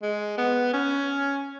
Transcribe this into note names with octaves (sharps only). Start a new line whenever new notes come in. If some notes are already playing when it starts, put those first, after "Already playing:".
G#3
B3
C#4